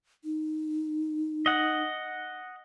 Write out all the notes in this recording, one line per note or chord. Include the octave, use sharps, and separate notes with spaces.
D#4
D#5 F#5